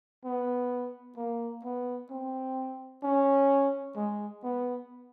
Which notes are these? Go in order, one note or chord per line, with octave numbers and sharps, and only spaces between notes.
B3
A#3
B3
C4
C#4
G#3
B3